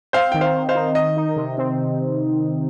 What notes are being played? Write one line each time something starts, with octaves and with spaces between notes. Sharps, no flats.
C4 C5 F5
D#3 G5
C5 F5
D#3
C5 F5
D#4
D#3 D#5
D#4
C3
C4